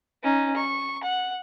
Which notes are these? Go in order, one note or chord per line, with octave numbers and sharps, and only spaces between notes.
C#4 D#4
C#6
F#5